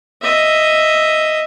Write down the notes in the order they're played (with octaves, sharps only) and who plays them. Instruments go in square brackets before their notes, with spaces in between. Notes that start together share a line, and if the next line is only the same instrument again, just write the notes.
[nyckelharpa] D#5 E5